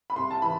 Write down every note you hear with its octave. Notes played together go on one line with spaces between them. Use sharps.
B5
C2 C6
A5
E3 B5